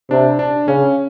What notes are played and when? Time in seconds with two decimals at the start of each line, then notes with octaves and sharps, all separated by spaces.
0.10 C3 D4
0.39 D4
0.68 C#3 C#4